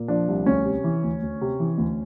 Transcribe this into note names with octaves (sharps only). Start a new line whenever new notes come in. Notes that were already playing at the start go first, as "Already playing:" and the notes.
Already playing: A#2
F3 D4
C2
D2 C#4
C3
E3
D2
D2
C3
E3
D2